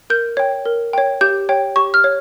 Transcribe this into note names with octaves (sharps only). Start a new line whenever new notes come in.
A#4 G6
C#5 G5
A#4
C#5 G5
G4 G6
C#5 G5
G4 C#6
F6
C#5